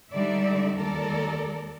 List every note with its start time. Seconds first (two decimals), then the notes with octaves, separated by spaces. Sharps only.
0.11 D3 G3 G#3 D#4 D5 E5
0.77 D#2 G#3 A4 A#4 D5